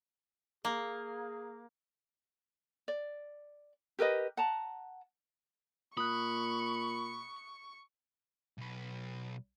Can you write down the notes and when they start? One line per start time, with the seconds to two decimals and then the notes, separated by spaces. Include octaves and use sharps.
0.65 A#3 G#4
2.88 D5
3.99 G4 A#4 B4 D#5
4.37 F#5 A5 A#5
5.97 A#2 B5 C#6 D#6 F#6
8.58 B1 B4